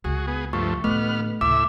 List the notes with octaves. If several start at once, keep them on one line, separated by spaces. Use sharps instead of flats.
C#2 F#4 G#4
B3 G#4
G2 F3 A3 C#6
A1 D3 A3 B3 F6
D2 A2 C#3 E5 D6 E6